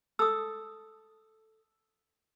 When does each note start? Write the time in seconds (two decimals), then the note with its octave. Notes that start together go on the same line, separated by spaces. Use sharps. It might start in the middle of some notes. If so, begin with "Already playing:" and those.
0.19 A4 D#6 E6